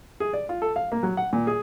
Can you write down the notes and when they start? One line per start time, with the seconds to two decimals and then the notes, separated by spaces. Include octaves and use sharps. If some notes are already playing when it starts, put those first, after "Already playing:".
0.20 G#4
0.33 D5
0.49 F4
0.62 A4
0.76 F5
0.92 A#3
1.03 F#3
1.17 F#5
1.33 A#2
1.47 G#4